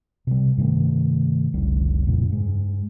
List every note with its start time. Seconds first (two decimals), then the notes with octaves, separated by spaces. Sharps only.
0.27 C3 G3
0.57 G2 C3 D#3 A3
1.54 F1 C2 D3 G3
2.06 F2 A#2 C#3
2.29 G2 G#3